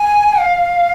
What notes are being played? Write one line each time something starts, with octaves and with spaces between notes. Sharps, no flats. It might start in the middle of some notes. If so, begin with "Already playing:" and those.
Already playing: G#5
F5